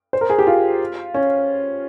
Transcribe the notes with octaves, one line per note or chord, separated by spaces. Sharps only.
C5
A#4
G#4
G4
F4
C#4